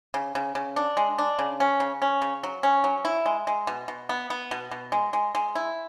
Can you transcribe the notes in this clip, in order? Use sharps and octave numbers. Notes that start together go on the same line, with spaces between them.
C#3
C#3
C#3
D4
G#3
D4
C#3
C#4
C#3
C#4
C#3
F#3
C#4
F#3
E4
G#3
G#3
B2
B2
B3
B3
B2
B2
G#3
G#3
G#3
E4